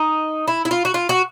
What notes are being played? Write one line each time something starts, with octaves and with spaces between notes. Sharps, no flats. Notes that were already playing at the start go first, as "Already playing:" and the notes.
Already playing: D#4
E4
E4
F4
F#4
F4
F#4